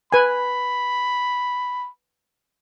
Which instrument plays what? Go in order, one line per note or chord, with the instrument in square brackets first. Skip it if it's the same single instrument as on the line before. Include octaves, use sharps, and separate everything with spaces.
[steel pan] B4 G#5 [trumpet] B5